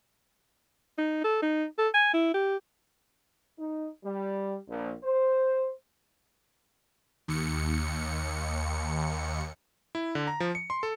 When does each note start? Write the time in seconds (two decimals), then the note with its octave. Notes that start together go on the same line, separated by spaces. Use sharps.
0.98 D#4
1.24 A4
1.42 D#4
1.78 A4
1.94 G#5
2.14 E4
2.34 G4
3.57 D#4
4.04 G3
4.68 A#1
5.02 C5
7.28 D#2 C#7
9.95 E4
10.15 D3
10.27 A#5
10.40 F3
10.55 C#7
10.70 C6
10.83 A4